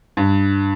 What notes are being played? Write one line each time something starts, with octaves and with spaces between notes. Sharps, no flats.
G2